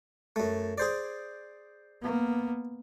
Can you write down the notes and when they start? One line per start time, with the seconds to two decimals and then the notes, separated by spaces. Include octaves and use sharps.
0.36 F#2 A3
0.78 G#4 C5 D5
2.02 A#3 B3